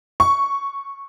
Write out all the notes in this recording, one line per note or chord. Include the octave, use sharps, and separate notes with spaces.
C#6